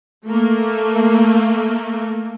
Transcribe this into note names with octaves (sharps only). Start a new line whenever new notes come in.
A3 A#3